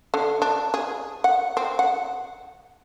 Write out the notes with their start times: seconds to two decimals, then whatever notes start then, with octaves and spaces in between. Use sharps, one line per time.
0.14 D3
0.42 D4
0.74 G#4
1.24 F#5
1.57 C4
1.79 F#5